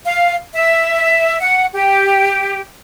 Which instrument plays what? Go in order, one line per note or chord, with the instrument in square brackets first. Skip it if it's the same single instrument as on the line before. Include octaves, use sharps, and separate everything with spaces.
[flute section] F5
E5
F#5
G4